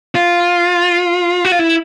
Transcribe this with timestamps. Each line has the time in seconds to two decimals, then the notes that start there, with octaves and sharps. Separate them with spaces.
0.15 F4
1.45 F#4
1.52 F4
1.59 E4